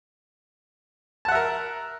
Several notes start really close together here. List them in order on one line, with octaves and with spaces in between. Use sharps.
A5 F#5 E5 A#4